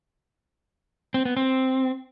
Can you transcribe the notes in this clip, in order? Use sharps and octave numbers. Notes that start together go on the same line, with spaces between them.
C4
B3
C4